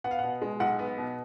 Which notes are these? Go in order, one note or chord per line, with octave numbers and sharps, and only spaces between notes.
B3 F#5
F5
B2 F#5
G#3
B1 F#5
B3
B2